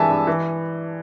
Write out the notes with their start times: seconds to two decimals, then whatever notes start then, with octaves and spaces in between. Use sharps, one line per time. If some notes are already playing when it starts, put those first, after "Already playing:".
Already playing: G2 E3 G#3 E5 G#5 A5
0.10 G2
0.27 E3